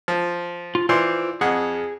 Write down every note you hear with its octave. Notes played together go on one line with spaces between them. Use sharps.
F3
F4
E3 F4 C5 D5 C6
F2 G#4 F#5